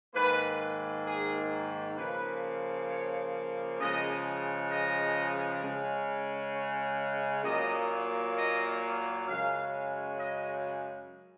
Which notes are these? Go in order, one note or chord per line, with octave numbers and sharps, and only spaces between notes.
G#2 D#3 A#3 B4
G#4
C#3 F3 A#3 B4
C#5
C#3 F3 G#3 D#5
D#5
C#3 G#3
C#5
A#2 F#3 A#3 D#5
D#5
F#2 C#3 G#3 F5
D#5